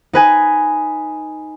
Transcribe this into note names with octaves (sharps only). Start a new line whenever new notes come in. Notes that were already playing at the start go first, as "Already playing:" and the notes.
D#4 B4 G#5